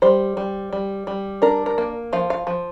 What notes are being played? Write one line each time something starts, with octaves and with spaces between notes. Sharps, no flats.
G3 C5
G3
G3
G3
D4 A#4
A#4
A#3
F3 F5
F5
F3